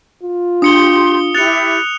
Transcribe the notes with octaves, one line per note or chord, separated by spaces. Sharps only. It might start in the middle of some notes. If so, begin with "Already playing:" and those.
F4
D4 G4 C6 D#6 C#7 G7
E4 G4 F#6 A6 C#7 F7